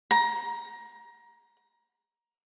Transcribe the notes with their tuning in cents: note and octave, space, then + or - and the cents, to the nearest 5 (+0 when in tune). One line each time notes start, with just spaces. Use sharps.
A#5 +20